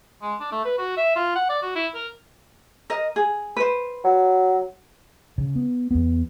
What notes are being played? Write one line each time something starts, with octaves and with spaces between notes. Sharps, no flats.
G#3
D4
A3
B4
F#4
E5
F4
F#5
D5
F#4
E4
A#4
A#4 D#5
G#4
B4 C5
F#3
C#3
B3
E2 B3